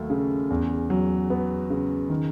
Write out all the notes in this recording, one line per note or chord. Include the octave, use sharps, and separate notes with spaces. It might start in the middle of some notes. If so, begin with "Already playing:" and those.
Already playing: D#2 F#3 A3
C#3
E2
F#3
B3
C#3
D#3